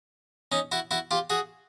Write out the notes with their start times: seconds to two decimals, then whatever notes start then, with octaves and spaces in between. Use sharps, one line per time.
0.52 C#4 D#4
0.72 E4 F#4
0.91 E4 F#4
1.11 F4 G4
1.30 F#4 G#4